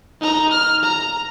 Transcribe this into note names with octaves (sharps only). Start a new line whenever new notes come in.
D#4 A#5
F6
A#5